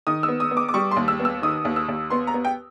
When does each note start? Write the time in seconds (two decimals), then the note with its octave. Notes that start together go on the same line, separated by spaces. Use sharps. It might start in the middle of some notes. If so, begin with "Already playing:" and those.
0.07 D#3 D#6
0.23 E6
0.28 B3
0.40 D#6
0.51 B3
0.57 D6
0.69 D6
0.74 G3 C#6
0.91 C6
0.97 D#2
1.08 E6
1.20 B3
1.25 E6
1.42 D#3 D#6
1.65 D#2
1.76 E6
1.89 D#2
2.10 B3 C6
2.27 A#5
2.34 B3
2.45 G5